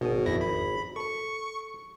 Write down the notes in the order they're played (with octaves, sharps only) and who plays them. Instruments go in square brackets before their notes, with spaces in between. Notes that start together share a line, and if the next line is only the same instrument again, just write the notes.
[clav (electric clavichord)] G#1 G#5 [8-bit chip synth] B2
[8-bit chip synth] F2 E4 A#6
B5
[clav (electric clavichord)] A4 [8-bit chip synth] C#6 C#7